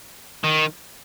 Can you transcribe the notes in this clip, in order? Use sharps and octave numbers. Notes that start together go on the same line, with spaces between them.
D#3